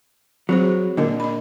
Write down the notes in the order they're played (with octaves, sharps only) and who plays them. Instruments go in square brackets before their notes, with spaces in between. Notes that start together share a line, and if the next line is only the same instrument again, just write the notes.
[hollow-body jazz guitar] F#3 [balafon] C4 G#4 C5
[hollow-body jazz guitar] A#2 D3 [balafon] A#4 D#5
[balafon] D#5 B5